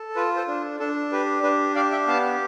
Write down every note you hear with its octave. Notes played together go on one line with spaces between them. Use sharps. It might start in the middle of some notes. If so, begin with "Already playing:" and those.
Already playing: A4
F4 B4
A4 C5
D4
D4 A4
G4 B4
D4 B4
G4 D5 F5
E5 G5
B3 F5 A5